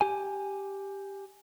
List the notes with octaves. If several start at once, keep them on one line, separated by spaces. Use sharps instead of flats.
G4 G#5